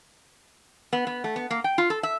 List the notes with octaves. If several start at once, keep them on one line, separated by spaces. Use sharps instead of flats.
B3
B3
A3
B3
A#3
G5
F4
A4
E5